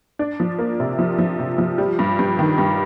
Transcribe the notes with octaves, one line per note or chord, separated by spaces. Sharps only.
D4
F3
A#3
C3
F3
F3
C3
F3
G3
G2
G2
D#3
G2